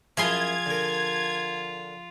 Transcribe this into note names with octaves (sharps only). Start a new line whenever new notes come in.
F#2 F3 E4 F4 G#4 C6 G#6
D3 A#4